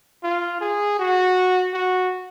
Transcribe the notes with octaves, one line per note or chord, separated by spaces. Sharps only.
F4
G#4
F#4
F#4